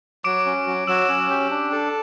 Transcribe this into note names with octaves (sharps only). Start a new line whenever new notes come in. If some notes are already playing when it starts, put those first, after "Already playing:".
F#3 D6 D7
C#4
F#3
F#3 E6 E7
C#4
G4
D4
A4